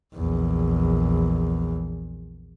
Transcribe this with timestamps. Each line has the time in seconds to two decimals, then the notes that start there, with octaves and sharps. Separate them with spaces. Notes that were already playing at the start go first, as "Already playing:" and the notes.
0.14 A#1 E2